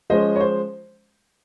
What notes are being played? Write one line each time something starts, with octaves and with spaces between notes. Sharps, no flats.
F3 G#3 C#4 C5 D#5
C#5
C5